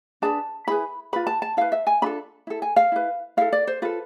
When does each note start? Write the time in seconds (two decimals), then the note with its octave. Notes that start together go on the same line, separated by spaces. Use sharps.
0.22 D4 G#4 B4 A5
0.67 E4 G#4 B4 B5
1.13 F4 B4 B5
1.27 A5
1.42 A5
1.57 E4 B4 F5
1.72 E5
1.87 G#5
2.02 D4 F4 A4 B5
2.47 E4 A4
2.62 G#5
2.76 F5
2.92 E4 B4
3.37 E4 A4 F5
3.53 D5
3.67 C5
3.82 F4 A4 B4